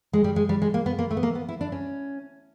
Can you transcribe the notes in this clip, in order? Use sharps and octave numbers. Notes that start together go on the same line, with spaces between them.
G#3
G3
G#3
G3
G#3
A#3
B3
A#3
A3
B3
A#3
B3
E4
D4
C#4